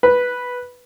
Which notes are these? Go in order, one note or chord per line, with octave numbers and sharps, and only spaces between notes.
B4